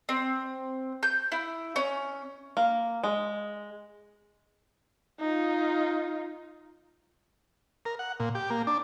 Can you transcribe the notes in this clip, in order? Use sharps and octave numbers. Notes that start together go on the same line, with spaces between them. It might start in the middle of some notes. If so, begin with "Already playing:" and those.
C4
G6
E4
C#4
A#3
G#3
D#4 F4
A#4
F#5
A#2
G4
A#3
D4